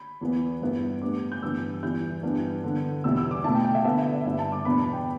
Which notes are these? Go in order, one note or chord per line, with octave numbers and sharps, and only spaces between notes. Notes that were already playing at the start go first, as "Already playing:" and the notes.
Already playing: B5
E2 E3 B3
G2 G3 B3 E4
A2 G3 B3 D4 D6
G6
G2 E3 B3 D4 E6
E2 E3 G3 E4 G6
G2 E3 B3 D4
D3 B3 D4
E2 B2 G3 B3 E4 E6
E6
D6
B2 A3 E4 A5
G5
G5
E5
D3 B3 E4 E5
E5
D5
G2 G3 E4 E5
A5
D6
E2 B2 B3 D4 B5
A5
G5